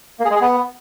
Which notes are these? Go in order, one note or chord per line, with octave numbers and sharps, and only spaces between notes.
A#3
G#4
G#3
G#4
B3